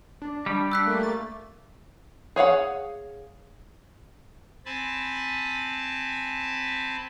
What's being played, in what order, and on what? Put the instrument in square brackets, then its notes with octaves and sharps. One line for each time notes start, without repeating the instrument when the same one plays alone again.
[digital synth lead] D4
[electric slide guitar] G3
[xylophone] E6 F#6 B6
[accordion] A3 A#3
[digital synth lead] A6
[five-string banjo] G#4 C#5 F5 F#5
[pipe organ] C4 G#5 A5 B5